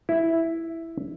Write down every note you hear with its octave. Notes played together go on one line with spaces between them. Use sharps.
E4